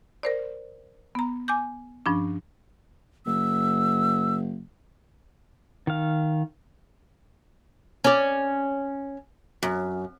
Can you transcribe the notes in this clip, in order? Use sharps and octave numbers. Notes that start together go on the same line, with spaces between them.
A#4 C5 D5
B3 A#5
G#5 D6 G6
G2 F3 C#4 D4
F#1 E6
D#3 F5
C#4 D5
F#2